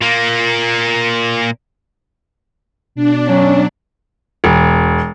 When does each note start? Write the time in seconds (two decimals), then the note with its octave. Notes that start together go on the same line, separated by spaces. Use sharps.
0.01 A#2 A#3
2.95 B2 D4
3.27 F#3 C#4
4.44 E1